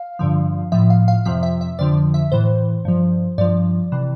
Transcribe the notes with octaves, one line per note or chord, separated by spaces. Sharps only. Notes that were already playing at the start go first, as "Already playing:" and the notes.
Already playing: F5
G2 D3 F3
A2 F3 E5
F5
F5
F2 C3 F3 E5
E5
E5
F2 D3 F3 D5
E5
A2 E3 C5
G2 F3
G2 F3 D5
C3 E3